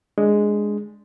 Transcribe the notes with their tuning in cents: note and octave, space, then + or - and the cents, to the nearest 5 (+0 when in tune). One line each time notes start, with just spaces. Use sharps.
G#3 +0 D4 +0